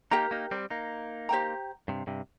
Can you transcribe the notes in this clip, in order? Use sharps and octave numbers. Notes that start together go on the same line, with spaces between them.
A#3 D#4 G4 A#4 G5 A#5
A#3 D#4
G3 C4
A#3 D#4
G4 C5 G5 A#5
G2 C3
G2 C3